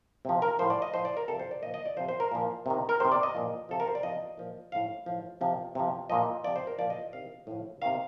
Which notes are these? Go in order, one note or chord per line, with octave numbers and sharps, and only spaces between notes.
C3 F3
A#4
A2 F3 C5
D5
D#5
A2 F3 C5
D5
A#4
C3 F3 A4
C5
D5
A#2 F3 D#5
D#5
D5
C3 F3 C5
C5
A#4
A#2 F3
C3 D#3
A#4
C3 D#3 C5
D5
D#5
A#2 F3
C3 F3 A4
A#4
C5
D5
C3 F3 D#5
A#2 F3
A2 F3 F5
A2 F3
C3 F3
C3 F3
A#2 F3 D#5
C3 F3 D5
C5
A#4
A#2 F3 D5
D#5
C3 D#3 F5
A2 F3
C3 D#3 F5